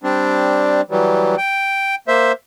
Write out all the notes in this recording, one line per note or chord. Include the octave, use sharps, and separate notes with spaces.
G3 C4 D4
E3 F#3 G3
G5
A#3 C5 E5